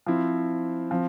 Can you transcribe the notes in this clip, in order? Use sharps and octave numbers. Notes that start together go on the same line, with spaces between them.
F3 C4 E4
F3 C4